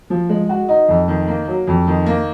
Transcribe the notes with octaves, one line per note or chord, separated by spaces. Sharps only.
F3
G#3
F#4
D#4
F2
D#3
A#3
F#3
F2
D#3
A#3